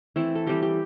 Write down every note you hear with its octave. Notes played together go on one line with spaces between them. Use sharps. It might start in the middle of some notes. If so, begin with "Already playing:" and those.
E3 A3 C4 E4
A4
E3 G3 C4 G4
G4